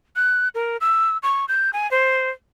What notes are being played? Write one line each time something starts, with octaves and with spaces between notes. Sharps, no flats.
F#6
A#4
E6
C#6
G6
G#5
C5